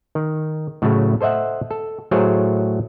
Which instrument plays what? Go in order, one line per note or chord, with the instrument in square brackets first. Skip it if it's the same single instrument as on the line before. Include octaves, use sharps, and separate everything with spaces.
[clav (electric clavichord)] D#3
A2 C#3 F#3 A3 E4
A4 C5 D#5 E5 F#5
A4
A2 F#3 A3 G#4 A#4 C5